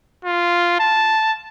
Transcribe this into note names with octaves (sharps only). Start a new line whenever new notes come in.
F4
A5